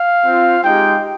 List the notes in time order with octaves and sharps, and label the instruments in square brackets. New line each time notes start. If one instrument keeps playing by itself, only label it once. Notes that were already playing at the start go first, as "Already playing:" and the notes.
Already playing: [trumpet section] F5
C4 F4
G#3 D#4 G4 G5